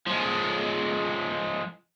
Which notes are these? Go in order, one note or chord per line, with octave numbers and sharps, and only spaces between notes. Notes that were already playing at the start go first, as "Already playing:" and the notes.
F3 G#3